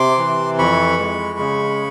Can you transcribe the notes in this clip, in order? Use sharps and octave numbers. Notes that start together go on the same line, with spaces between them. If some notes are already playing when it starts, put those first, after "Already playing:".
Already playing: C3 C6 D6
E3
F2 B5 C#6
G#3
C#3